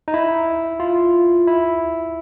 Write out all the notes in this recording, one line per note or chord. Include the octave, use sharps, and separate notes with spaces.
D#4
E4
F4
E4